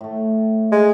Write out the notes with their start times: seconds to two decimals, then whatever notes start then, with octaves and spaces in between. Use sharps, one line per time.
0.01 A2 A3
0.72 G#3